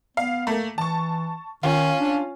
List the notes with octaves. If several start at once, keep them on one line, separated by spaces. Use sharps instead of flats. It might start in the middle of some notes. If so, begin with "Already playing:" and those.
B3 F5
A3 A#3
E3 A5 C#6
D#3 C#4 F4
D4